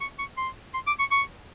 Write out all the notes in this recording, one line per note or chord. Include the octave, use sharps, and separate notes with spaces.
C#6
C#6
C6
C6
D6
C#6
C#6